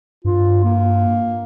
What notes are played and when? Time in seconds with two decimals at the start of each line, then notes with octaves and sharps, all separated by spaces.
0.25 G2 F4
0.64 A#3